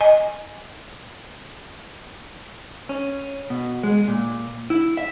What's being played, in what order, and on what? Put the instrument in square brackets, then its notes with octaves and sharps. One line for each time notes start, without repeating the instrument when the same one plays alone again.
[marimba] D#5 G#5
[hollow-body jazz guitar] C#4
B2
G#3
A#2
E4
E5